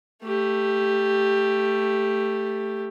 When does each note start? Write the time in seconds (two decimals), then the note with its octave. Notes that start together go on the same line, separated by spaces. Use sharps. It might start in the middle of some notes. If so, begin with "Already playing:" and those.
0.23 A3 G4